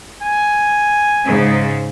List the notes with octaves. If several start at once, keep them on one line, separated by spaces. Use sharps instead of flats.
G#5
G#2 C#3